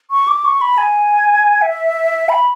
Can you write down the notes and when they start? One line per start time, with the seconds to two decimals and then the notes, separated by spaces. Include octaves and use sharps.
0.11 C#6
0.28 D6
0.45 C#6
0.61 B5
0.78 G#5
1.62 E5
2.29 B5